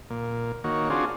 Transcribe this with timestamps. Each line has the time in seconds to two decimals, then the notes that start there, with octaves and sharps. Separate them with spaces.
0.10 A#2
0.64 D#3 A#3 F#4 C#5
0.90 C4 D4 F4 F#4 G#4